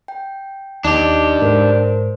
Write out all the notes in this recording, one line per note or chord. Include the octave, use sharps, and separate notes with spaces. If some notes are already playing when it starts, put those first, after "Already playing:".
G5
D#2 D4 D#4 G4 D#5 D6
G#2 A#4 C5